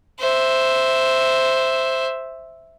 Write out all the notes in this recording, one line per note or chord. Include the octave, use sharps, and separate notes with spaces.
C5 E5